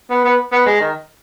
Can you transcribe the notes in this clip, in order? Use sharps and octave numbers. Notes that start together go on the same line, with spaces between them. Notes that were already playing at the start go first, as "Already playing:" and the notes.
B3
B3
B3
G#3
D#3